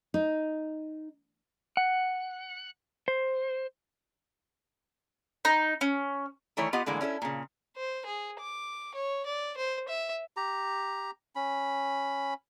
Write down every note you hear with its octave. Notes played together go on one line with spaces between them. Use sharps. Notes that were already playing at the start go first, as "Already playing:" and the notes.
D#4
F#5
C5
D#4
C#4
D#3 E3 A3 E4 C#5
B3 F4 G4 D#5 F#5
A2 D3 E3 G#3 A#3
C#4 E4 G4 A4
A#2 C#3
C5
G#4
D6
C#5
D5
C5
E5
G4 A#5
C#4 B5